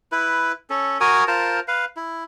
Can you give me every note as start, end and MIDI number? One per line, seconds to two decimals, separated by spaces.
0.12 0.52 64
0.12 0.52 71
0.70 0.98 61
0.70 0.98 69
1.00 1.24 66
1.00 1.24 70
1.00 1.24 80
1.00 1.24 87
1.28 1.60 65
1.28 1.60 70
1.28 1.60 72
1.28 1.60 81
1.68 1.85 71
1.68 1.85 77
1.96 2.24 64